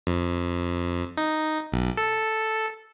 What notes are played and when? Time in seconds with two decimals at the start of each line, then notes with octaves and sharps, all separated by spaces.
0.07 F2
1.17 D#4
1.72 B1
1.98 A4